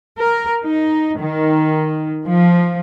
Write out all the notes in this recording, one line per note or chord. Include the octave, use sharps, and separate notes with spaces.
A#4
D#4
D#3
F3